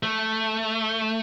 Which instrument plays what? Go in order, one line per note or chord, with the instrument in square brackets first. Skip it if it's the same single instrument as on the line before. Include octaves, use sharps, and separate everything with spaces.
[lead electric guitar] A3